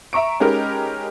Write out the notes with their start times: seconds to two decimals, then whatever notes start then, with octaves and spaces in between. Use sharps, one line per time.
0.13 E5 A#5 C#6 D7
0.40 G#3 C#4 D#4 G4 A#4 B4